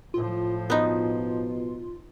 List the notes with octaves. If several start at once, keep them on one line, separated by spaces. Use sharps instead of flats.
A2 F3 F4
B2 B3 D#4 F4